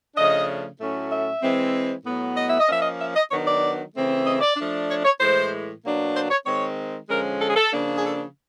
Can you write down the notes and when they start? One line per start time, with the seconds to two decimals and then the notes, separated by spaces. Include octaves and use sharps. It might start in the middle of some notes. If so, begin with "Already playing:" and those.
0.16 C#3 F3 A3 D4 D#5
0.79 A2 F#3 A3 C#4
1.11 E5
1.42 E3 G#3 C4
2.05 A2 F#3 B3
2.37 D#5
2.48 E5
2.59 D#5
2.68 F3 A#3 C#4 E5
2.82 D#5
2.99 E5
3.16 D#5
3.31 D#3 F#3 B3 D4 C#5
3.47 D5
3.94 C#3 E3 A3 C4
4.26 D#5
4.41 D5
4.57 F3 A3 D4
4.89 C#5
5.05 C#5
5.20 A2 E3 G#3 C5
5.83 B2 F#3 A#3 D4
6.15 C5
6.31 C#5
6.46 D#3 G#3 C4 C#5
7.09 D3 F3 G#3 C#4 A#4
7.41 A4
7.48 G#4
7.56 A4
7.72 C#3 F3 A#3 D4
7.96 G#4
8.04 A4